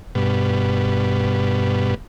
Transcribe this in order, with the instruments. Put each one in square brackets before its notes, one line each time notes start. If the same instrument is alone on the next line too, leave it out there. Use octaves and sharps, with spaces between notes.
[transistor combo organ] G2 B2